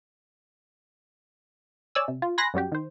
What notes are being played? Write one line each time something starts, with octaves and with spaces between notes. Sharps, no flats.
C#5 D5 G#5 E6
C3
F4
G#5 B5 C6 F#6 A#6
F#2 G3 F#4 G4
D#3 C5